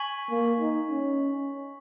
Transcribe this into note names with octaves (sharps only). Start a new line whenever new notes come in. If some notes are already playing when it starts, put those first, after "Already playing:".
Already playing: G#5 C#6 G#6 B6 F#7
A#3
D#4
C#4